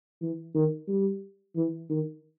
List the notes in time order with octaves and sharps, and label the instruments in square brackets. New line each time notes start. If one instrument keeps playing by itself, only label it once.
[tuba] E3
D#3
G3
E3
D#3